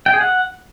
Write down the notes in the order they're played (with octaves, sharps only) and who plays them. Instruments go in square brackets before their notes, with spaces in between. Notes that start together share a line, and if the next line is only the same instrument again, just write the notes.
[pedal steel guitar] G5
G#4
F#5